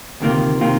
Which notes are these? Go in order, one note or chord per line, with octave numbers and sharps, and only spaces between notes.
D2 C3 D#3 A#3 F4
C3 D#3 A#3 F4